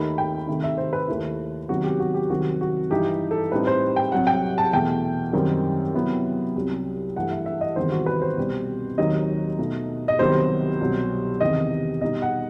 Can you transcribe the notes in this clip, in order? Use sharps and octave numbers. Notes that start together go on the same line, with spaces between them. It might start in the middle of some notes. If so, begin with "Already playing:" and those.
Already playing: D#2 D#3 A3 D#4 B5
G5
C3 D#3 A3 D#4
E5
C5
B4
D#2 D#3 A3 E4
C3 D#3 F#3 B3 F#4
G4
F#4
G4
C2 C3 D#3 F#3 C4 F#4
F#4
G2 E3 G3 D#4 G4
A4
A2 G3 C4 D#4 B4
C5
G5
C2 C3 F#3 F#5
G5
A5
E2 B2 A3 G5
F#2 D#3 G3 C4 D#4
C3 F#3 B3 E4
C2 C3 F#3
G2 E3 A3 F#5
E5
E5
D#5
E2 C3 D#3 G3 C5
F#4
B4
C5
C2 B2 G3 C4
D#2 D#3 F#3 C4 D#4 D#5
B2 A3 D#4
D#5
C2 C3 D#3 F#3 B3 C5
C2 B2 F#3
E2 C3 D#3 D#5
B2 G3 D#4 D#5
F#5